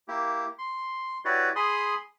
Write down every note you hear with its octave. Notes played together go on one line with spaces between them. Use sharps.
A#3 E4 G4
C6
E4 F#4 G4 B4 C#5 D5
G#4 B5 C6 D#6